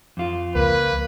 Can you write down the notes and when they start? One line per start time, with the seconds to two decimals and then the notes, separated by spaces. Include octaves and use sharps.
0.17 F2 F4
0.55 C#2 A#3 B4